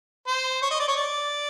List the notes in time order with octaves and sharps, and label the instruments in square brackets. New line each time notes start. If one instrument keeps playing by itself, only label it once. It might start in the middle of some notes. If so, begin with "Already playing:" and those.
[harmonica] C5
C#5
D#5
D5
C#5
D5